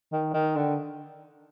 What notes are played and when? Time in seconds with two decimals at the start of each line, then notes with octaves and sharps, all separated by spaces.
0.12 D#3
0.34 D#3
0.56 D3